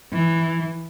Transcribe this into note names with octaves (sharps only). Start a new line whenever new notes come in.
E3